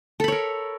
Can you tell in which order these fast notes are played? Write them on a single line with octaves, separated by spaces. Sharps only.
A4 B5 C#5 A#4